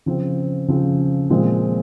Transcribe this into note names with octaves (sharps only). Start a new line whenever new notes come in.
C#3 F3 C4
C#3 F3 C4
A#2 F3 G#3 C4